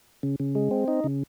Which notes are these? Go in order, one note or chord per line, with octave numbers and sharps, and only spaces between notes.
C#3
C#3
G#3
C4
D#4
C#3